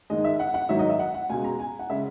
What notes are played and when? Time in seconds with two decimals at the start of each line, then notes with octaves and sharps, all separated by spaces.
0.10 G#2 D#3 G#3 D#5
0.25 E5
0.40 F#5
0.54 F#5
0.69 G#2 D#3 F#3 E5
0.79 D#5
0.89 E5
0.99 F#5
1.14 F#5
1.29 C#2 B2 G#3 G#5
1.44 A#5
1.60 G#5
1.79 F#5
1.89 C#3 G#3 E5